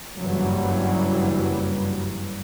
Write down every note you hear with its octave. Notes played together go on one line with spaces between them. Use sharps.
F#1 G2 E3 F#3 G3